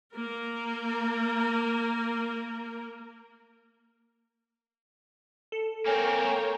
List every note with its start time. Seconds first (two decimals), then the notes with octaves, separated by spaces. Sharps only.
0.15 A#3 A#4
5.52 A4
5.86 A#3 C4 A#4 C#5 G5 G#5